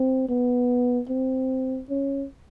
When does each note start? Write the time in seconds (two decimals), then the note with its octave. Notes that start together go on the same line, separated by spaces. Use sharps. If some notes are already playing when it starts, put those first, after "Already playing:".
Already playing: C4
0.29 B3
1.09 C4
1.90 C#4